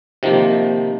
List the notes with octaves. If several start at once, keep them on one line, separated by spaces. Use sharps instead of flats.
C3 D#3 F3 A#3